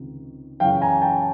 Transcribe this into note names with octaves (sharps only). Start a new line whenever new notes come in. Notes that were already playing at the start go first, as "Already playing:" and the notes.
Already playing: C#2 C3 D#3
F#2 C#3 E3 F5 G5
G#5 A#5
G5 A5